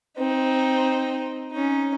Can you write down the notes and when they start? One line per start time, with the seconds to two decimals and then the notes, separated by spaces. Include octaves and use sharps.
0.18 C4 D#4
1.52 C#4 D#4